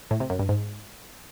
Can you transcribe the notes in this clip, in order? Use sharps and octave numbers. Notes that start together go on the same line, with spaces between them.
A2
C3
F#2
G2
G#2